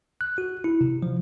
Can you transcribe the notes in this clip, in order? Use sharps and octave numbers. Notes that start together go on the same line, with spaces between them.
F#6
F#4
E4
C3
F3